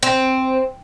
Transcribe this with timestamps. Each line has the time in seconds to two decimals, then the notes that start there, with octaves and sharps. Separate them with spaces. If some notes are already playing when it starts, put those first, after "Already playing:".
0.03 C4